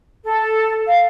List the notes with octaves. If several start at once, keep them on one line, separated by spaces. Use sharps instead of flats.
A4
F5